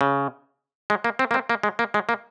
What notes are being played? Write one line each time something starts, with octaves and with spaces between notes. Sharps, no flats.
C#3
G#3
A#3
C4
A#3
C4
A#3
G#3
A#3
G#3
A#3